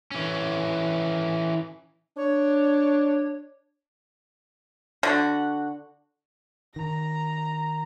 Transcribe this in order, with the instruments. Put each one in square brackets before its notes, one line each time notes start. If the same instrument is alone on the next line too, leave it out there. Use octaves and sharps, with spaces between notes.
[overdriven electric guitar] E3 C#4
[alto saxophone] D4 [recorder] C#5
[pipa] D3 F#4
[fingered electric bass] D#3 [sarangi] A#5